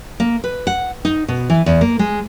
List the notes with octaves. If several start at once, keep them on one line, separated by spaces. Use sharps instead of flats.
A#3
B4
F#5
D#4
B2
E3
E2
A#3
G#3